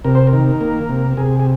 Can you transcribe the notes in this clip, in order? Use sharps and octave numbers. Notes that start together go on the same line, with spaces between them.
C3 A#4
C5
A#4
D#3
A#3
C3
C3 G#4
G#4